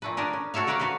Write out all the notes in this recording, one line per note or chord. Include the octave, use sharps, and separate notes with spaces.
A#2 A3 B4
D4 G#4 A#4 B4
C#4
F#4 A4 C#5 E5 F5
A3 A#4 B4 C#5 D5 F5
F#4 B4 C5 F5